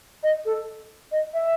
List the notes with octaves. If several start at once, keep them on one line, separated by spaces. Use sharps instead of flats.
D#5
A4
D#5
E5